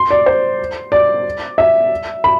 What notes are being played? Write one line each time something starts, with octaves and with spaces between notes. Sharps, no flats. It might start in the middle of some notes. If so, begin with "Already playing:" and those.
Already playing: C6
D5
C5
D5
E5
B5